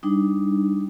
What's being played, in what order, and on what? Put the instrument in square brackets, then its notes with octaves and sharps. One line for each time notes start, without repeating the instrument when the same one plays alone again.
[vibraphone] G3 D4 D#4